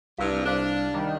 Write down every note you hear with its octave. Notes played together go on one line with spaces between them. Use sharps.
C2 G2 F5 A#5 E6 F6
D4 C5 F5
D#3 G3